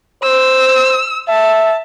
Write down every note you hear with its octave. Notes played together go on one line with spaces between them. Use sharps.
C5 E6
E5 A5